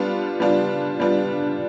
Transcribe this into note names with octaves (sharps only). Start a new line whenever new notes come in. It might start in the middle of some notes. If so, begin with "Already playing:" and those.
Already playing: G3 B3 D4 F4
G3 B3 D4 F4
G3 B3 D4 F4